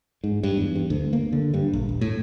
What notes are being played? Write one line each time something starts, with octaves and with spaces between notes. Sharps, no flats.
G#2
G2
E2
G2
D2
A#3
D3
G2
A#1
D#1
A2